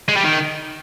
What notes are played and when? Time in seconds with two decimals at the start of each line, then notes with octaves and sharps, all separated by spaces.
0.08 G#3
0.16 G3
0.24 D#3